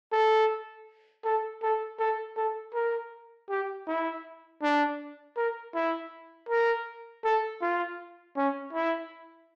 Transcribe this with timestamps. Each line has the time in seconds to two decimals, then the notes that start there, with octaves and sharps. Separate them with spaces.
0.12 A4
1.25 A4
1.62 A4
1.99 A4
2.37 A4
2.74 A#4
3.50 G4
3.87 E4
4.62 D4
5.37 A#4
5.75 E4
6.49 A#4
7.24 A4
7.62 F4
8.36 C#4
8.73 E4